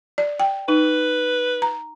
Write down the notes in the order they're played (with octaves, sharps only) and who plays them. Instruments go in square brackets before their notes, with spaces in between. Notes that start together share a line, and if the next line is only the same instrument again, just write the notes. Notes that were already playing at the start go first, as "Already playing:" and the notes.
[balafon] D5
G5
[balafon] D#4 [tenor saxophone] B4
[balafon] A#5